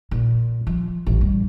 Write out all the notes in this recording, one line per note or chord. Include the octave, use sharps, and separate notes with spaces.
A#2
F3
A1
G2